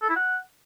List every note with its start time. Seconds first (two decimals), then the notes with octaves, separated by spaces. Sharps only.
0.02 A4
0.09 E4
0.16 F#5